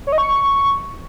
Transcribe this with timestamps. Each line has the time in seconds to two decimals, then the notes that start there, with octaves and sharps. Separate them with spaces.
0.07 C#5
0.12 D#5
0.18 C#6